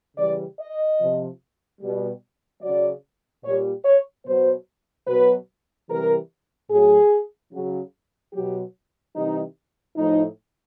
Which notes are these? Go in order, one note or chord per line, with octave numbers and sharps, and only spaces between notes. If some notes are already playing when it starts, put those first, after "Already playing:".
C#3 E3 G3 D5
D#5
C3 F3
B2 G3
C#3 F#3 D5
A#2 G3 C#5
C#5
B2 F#3 C5
B2 F#3 B4
C3 E3 G3 A#4
A2 F#3 G#4
C#3 F#3
B2 F#3 G4
C3 E3 G3 D#4
A2 F3 D#4